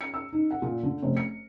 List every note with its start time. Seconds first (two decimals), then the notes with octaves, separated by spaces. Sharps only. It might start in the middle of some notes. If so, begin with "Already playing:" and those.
0.01 C#7
0.14 E6
0.33 D#4
0.51 F#5
0.62 A#2
0.83 D3
1.03 F1
1.17 C#7